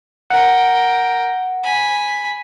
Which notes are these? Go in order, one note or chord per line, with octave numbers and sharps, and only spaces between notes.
A#4 F#5 G5
G#5 B5